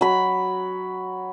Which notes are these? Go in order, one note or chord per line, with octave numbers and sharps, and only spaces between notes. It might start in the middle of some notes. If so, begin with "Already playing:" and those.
F#3 B5